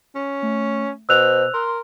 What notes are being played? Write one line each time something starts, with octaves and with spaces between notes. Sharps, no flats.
C#4
A3
B2 C5 E6 F#6 F7
A#4 C6